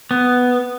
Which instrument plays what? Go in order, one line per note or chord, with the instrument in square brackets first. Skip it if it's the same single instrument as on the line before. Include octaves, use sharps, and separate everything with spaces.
[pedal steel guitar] B3